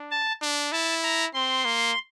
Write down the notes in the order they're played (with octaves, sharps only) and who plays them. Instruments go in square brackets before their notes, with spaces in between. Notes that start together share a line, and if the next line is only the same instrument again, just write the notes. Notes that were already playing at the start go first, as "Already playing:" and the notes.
Already playing: [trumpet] D4
[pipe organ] A5
[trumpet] D4
[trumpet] E4 [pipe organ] A5
[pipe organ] A#5
[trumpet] C4 [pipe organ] C6
[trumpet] A#3